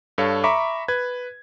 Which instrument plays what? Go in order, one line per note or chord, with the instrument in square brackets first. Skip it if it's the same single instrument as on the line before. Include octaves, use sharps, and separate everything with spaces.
[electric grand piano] G2 A4 C#5 F5
E5 A#5 B5 C#6 D6
B4 G#6